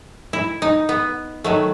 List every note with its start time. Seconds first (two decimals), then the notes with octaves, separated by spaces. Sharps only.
0.33 E4
0.62 D#4
0.89 B3
1.44 D#3 F#3 A3